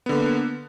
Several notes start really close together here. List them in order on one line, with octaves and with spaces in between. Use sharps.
B3 D3 A#3